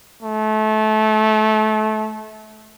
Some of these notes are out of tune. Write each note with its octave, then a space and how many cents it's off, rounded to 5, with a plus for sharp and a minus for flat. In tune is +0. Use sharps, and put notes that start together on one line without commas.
A3 -25